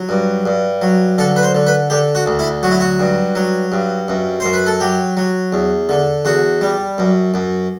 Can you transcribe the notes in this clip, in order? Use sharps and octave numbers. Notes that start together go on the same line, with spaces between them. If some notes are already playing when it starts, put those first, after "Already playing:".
Already playing: F#3
G2
G2
F#3
D3 A4
B4
C5
D3
B4
D3 G4
F#4
D2
E4
F#3 F#4
E4
F#4
G2
F#3
G2
F#2
F#2 C5
B4
A4
F#3 G4
F#3
E2
D3
E2 F#4
G3
F#2
F#2